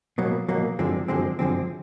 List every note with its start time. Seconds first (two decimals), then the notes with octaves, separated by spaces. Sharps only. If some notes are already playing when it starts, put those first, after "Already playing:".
0.18 B2 F#3 A#3
0.48 B2 F#3 A#3
0.79 F#2 D3 F3 G#3 C4
1.08 F#2 D3 F3 G#3 C4
1.39 F#2 D3 F3 G#3 C4